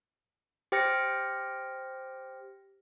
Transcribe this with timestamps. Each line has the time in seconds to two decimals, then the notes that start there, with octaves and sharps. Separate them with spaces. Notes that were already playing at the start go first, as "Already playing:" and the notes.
0.72 G4 C5 G5 F6 A#6 C#7